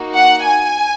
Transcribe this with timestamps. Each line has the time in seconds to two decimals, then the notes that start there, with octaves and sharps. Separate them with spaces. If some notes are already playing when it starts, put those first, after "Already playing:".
Already playing: A#3 D#4 F#4
0.15 F#5
0.44 G#5